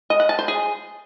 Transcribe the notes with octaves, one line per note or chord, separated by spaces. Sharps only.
D#5
F#5
A5
C5
G#4